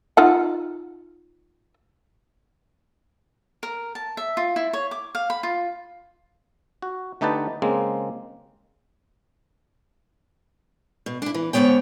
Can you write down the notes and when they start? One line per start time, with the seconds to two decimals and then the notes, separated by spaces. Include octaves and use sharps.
0.17 D#4 F4 F#5
3.63 A#4
3.95 A5
4.17 E5
4.37 F4
4.56 E4
4.73 C#5
4.91 D6
5.15 F5
5.30 B5
5.43 F4
6.82 F#4
7.21 D3 A3 D#4 G4 B4 A5
7.62 C#3 G#3 A#3 C4
11.06 B2
11.22 D4 E4
11.34 E3
11.53 G#2 D3 D#3 B3 C#5 G5